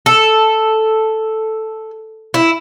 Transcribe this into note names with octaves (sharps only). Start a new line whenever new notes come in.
A4
E4